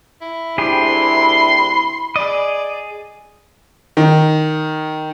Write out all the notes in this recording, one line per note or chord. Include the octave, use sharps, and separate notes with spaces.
E4
D2 C3 D4 E4 G4 G#4 B5 C6
G#4 D5 D#5
D#3